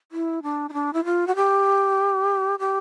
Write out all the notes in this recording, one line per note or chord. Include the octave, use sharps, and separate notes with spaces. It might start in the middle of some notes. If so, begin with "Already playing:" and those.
E4
D4
D#4
D4
E4
F4
F#4
G4
G4